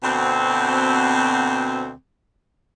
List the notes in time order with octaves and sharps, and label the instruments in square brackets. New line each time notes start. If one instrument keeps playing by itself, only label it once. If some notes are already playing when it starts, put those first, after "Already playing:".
[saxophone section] D2 B2 C4